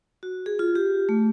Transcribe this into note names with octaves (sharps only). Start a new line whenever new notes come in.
F#4
G#4
F4
G4
A3